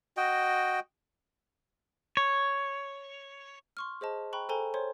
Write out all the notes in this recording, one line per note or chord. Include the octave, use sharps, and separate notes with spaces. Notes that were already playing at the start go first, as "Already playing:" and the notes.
F#4 D#5 G5
C#5
C6 C#6 F6
G#4 C5 D#5 A5
G5 A#5 B5 C#6 F#6
A4 C5 G5 G#5 A#5 G7
C5 C#5 C6